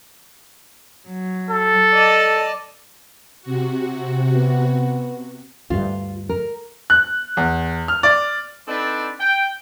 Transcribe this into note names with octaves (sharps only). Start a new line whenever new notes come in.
F#3
A4
D5 D#5 A5
C3 F#4
B3
D2 G2 F4
A#4
F#6
E2
F6
D5
C4 D4 D#4 A4 B4 D5
G5